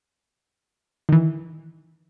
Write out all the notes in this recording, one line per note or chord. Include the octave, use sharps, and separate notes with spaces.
D#3 E3